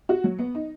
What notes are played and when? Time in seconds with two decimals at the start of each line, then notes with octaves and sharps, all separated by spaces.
0.09 F#4
0.24 F#3
0.39 B3
0.55 D#4